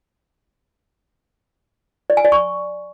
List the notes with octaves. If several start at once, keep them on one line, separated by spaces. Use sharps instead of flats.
D5
G#5
D5
C#6